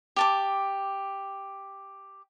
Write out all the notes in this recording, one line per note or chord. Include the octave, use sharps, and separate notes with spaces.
G4 A5 D6